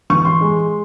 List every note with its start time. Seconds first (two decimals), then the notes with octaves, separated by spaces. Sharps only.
0.10 E3 C#6
0.25 C6
0.41 G#3